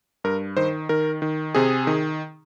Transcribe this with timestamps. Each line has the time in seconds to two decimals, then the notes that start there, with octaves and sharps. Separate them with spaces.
0.24 G2 A#4
0.57 D#3 C5
0.89 D#3 A#4
1.22 D#3
1.55 C3 G#4
1.87 D#3